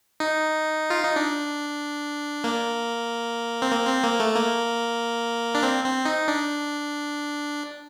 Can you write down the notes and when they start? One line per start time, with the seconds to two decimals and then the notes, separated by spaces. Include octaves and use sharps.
0.20 D#4
0.90 F4
1.03 D#4
1.16 D4
2.44 A#3
3.62 C4
3.71 A#3
3.87 C4
4.04 A#3
4.20 A3
4.35 A#3
5.55 D4
5.63 C4
5.84 C4
6.05 D#4
6.28 D4